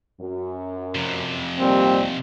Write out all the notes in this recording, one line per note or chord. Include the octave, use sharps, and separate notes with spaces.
F#2
F2 C3
A#2 D#3 G3 C4